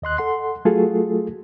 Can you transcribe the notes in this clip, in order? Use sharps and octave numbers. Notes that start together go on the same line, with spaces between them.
D#2 D#5 C6 F#6
A4 F#5 C6
F#3 A3 F4 F#4 G#4 A4